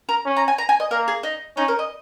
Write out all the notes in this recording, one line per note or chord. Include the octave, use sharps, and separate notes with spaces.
A#4
C#4
A#5
G#5
A#5
G#5
D#5
A#3 A#4
G#4
D#4
C#4 D#4
A#4
D#5